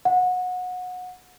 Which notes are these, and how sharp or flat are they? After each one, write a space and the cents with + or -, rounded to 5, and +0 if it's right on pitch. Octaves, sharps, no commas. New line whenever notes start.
F#5 -25